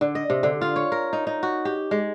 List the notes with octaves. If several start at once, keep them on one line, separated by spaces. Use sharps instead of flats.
D3
D#5
C3
D3
F4
C#5
A#4
D#4
D#4
F#4
G4
G#3